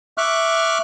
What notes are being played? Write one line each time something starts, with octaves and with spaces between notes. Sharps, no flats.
E5 C#6 D6 F6 F#6